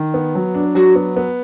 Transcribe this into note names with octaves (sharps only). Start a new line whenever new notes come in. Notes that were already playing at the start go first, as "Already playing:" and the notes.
Already playing: D#3
B3
F#3
D4
F#3 F#4
B3
B3